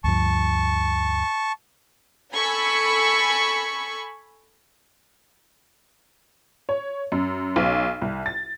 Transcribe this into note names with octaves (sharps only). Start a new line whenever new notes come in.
D2 G2 F3 A5 C#6
A4 G#5 B5 C#6 E6
C#5
F#2
B1
C2
A6